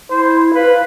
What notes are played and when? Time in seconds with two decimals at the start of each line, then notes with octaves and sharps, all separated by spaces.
0.10 E4 C5
0.55 B4 F5